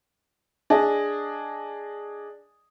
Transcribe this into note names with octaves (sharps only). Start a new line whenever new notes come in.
D4 G#4 D#5